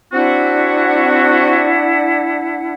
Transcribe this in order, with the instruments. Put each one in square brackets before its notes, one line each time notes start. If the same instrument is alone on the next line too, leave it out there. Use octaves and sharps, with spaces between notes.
[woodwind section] C4 F#4 [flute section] D4 E4 F#5